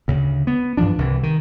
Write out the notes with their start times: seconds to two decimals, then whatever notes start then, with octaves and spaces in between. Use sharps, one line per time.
0.08 D2 C#3
0.47 B3
0.77 G2 E3 F3 D4
0.98 C2 C3 E3
1.23 D#3